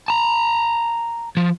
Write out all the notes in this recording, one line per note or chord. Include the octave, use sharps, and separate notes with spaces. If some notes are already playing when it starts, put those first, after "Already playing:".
A5 A#5
F3